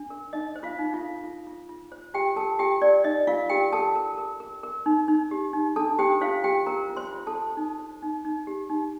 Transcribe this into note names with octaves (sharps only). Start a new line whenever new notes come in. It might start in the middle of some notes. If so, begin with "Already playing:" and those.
Already playing: D4
A#4
D#4 D#5
C5
F4 F5
D#4
F4 F5
A4
F4
F4
F4
C5
F4 G4 G5
A4 A#4 A5
F4 G4 G5
A#4 D5
D#4 D#5
F4 A#4 F5
G4 A#4 G5
A4 A#4 A5
A#4
A#4
A#4
A#4
D#4
D#4
G4
D#4
D4 A4 A5
G4 C5 G5
F4 C5 F5
G4 G5
A#4 C5 A#5
F4
C5 C6
F4
A4 A5
C5
D#4
C5
D#4
D#4
G4
D#4